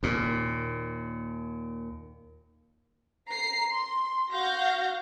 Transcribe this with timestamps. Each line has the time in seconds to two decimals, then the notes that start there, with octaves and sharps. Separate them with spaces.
0.03 D#2 A#2
3.27 A#5 C7
3.72 C6
4.31 F#4 F5 G6 A#6